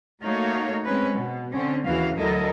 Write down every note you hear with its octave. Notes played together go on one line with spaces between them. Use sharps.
A3 A#3 D#4 F#4 C#5 F5
G#3 C4 C#4 B4
B2
D3 C4 C#4
D#2 C#3 E3 F#4 F5
D2 F#3 E4 A4 A#4 D#5